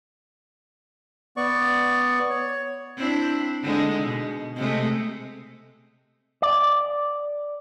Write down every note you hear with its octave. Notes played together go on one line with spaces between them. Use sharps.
B3 D5 C#6
C#5
C4 D4 E4
D3 G#3 D#4
B2
C3 G#3 A3
D5